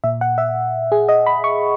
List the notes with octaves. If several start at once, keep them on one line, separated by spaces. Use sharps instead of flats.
A#2 E5
F#5
E5
G#4
D#5
B5
C#6